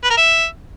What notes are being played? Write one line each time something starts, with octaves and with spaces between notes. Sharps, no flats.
B4
A#4
E5